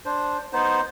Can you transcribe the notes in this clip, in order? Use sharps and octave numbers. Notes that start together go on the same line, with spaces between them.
D4 C5
B3 D#4 C5